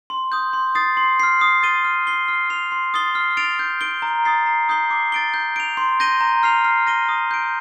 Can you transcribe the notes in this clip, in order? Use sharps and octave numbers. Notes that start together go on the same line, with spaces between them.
C6
D#6 G6
C6
D#6 A6 C7
C6
F6 C7
D#6
A6 D#7 G7
F6
C7 G7
F6
C7 F7
C6
D#6 A6 C7 G7
F6
A6 D7 F7
G6
D7 G7
A#5
D#6 A6 C7
A#5
D#6 G6 C7 G7
D6
A6 D7 G7
G6
D7 F7
C6
G6 A#6 D#7 G7
A#5
F6 C7 F7
F6
A#6 D#7 G7
D#6
G6 D7